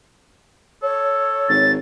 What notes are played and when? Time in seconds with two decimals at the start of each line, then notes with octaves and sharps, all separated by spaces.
0.83 A4 C#5
1.49 G#1 A6